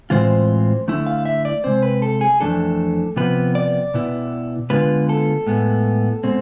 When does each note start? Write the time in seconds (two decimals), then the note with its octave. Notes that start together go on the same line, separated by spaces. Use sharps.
0.10 A2 E3 G#3 C4 F4 C5
0.88 D2 D3 A3 E4
1.07 F5
1.25 E5
1.45 D5
1.64 C3 G#3 C4 C5
1.83 B4
2.02 A4
2.21 G#4
2.40 F2 E3 A3 D4 A4
3.16 C3 F3 B3 B4
3.55 D5
3.94 B2 B3 E4
4.70 D3 G#3 B3 F4 B4
5.09 A4
5.47 A2 G#3 B3
6.24 B2 G#3 C4